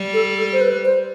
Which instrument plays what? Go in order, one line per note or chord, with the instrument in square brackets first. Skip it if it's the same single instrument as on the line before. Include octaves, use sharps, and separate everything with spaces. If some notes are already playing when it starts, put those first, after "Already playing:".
Already playing: [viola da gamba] G3
[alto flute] A4
A4
C5
B4
C5